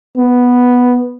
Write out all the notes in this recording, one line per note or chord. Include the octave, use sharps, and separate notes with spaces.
B3